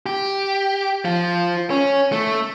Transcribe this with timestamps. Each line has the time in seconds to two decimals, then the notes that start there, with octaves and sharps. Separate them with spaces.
0.06 G4
1.05 F3 F4
1.70 C#4
2.12 A3